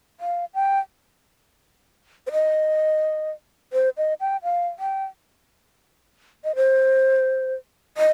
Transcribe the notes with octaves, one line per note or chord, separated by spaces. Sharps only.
F5
G5
C5
D#5
C5
D#5
G5
F5
G5
D#5
C5
D#5